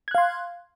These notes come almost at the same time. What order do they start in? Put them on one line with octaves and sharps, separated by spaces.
G#6 F#6 F5 C6